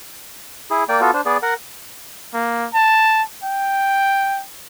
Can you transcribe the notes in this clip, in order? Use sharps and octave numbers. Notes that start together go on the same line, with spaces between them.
E4 G#4
A#3 D5 G5
B3 F4 F#4 A4
D4 C5
B3 G#4 D5
A#4 F#5
A#3
A5
G5